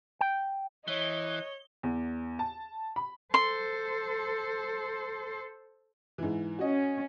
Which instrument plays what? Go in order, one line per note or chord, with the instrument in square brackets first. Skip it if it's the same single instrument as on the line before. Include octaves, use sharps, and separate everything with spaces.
[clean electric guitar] G5
[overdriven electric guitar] E3 [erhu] C#5 [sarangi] D#5 [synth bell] G7
[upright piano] E2
A5
B5
[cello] A4 C5 [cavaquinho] C6
[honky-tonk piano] G#2 E3
[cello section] C#4 [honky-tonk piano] F#4 D#5